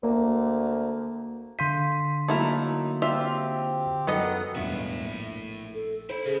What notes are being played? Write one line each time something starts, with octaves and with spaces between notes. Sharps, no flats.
D2 A#3
D3 F5 C6 G6 B6 D#7
F#3 A3 A#3 D#4 E4 A#4
C4 F4 G4 E5
F#2 D#3 F#3 B3 A4 D#5 F#5 F#6
E1 G2 A3 E4 F4
A#1
A4
E4 C5 B5
C#3 G#4